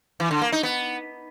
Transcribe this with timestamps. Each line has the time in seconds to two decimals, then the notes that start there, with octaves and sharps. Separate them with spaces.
0.20 E3
0.31 D3
0.42 A#3
0.52 D#4
0.63 B3